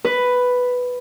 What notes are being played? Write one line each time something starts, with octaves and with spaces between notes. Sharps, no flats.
B4